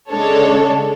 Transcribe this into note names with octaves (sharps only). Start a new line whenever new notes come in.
C#3 G#3 D4 A4 C#5